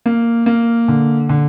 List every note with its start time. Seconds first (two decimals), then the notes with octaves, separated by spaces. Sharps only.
0.06 A#3
0.46 A#3
0.88 D3
1.29 D3